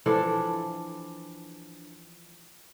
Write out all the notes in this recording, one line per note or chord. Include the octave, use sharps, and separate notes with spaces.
E3 F3 D4 A4